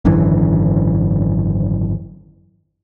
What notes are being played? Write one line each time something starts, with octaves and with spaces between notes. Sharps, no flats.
G#1 F#2 D3 E3